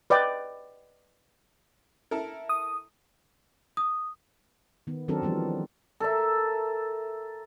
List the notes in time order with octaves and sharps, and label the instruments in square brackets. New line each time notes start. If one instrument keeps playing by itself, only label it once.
[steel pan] B4 D5 D#5 G5
[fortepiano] E4 A4 A#4
[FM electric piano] D#6
[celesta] D#6
[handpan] D#3 B3
D#3 F#3 C4 D4 A4 A#4
E3 F3 G3 B3
[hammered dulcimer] A4 A#4 E5